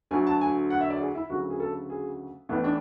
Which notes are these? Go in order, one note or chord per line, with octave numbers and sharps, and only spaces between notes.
D2 D3 F#3 G#5
A5
G#5
F#5
E5
D5
G#4
E4
D2 C#3 F#3 F#4
G#4
A4
G#4
A1 A2 E3 B3
D4